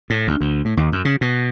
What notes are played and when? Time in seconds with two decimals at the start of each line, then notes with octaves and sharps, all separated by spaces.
0.10 A2
0.27 D2
0.41 D2
0.65 A2
0.77 D#2
0.92 F#2
1.05 C#3
1.21 B2